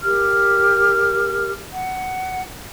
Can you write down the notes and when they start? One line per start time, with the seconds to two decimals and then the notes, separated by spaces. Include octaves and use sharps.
0.03 G4 A#4 F6
1.73 F#5